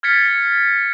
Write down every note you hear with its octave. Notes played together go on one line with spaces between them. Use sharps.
F6 G#6 A6 B6 C#7